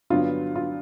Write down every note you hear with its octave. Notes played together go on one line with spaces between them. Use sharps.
G2 D3 F#3 B3 F4
F4